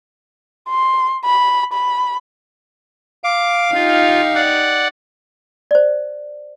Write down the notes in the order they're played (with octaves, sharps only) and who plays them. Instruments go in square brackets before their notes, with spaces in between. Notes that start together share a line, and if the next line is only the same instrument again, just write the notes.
[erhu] C6
B5
B5
[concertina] F5 [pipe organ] D6
[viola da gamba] D#4 G4 [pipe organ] F4
[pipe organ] D5 F#5
[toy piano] C5 D5